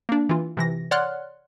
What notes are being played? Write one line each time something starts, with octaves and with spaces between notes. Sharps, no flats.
A#3 D4
E3 F4
C3 E3 A#6
C#5 D5 F#5 C6 F6 F#6